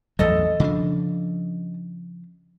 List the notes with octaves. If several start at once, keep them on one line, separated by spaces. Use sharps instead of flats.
A1 E2 F#3 A4 D#5
C#3 F3 D4